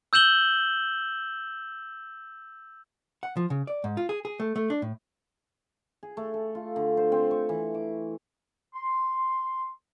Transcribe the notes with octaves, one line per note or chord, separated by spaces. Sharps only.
E6 G6 E7 F#7 G7
F#5
F3
C#3
D5
G#2
F4
G#4
G#4
A3
A3
D4
A2
G#4
A3
A4
F4
D3
C5
C4
C#6
E3
D6
C6